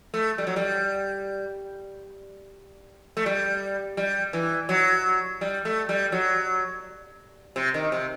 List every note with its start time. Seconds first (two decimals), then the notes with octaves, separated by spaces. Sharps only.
0.14 A3
0.38 G3
0.47 F#3
0.56 G3
3.17 A3
3.26 G3
3.97 G3
4.33 E3
4.69 F#3
5.41 G3
5.65 A3
5.89 G3
6.12 F#3
7.56 C3
7.74 D#3
7.92 C3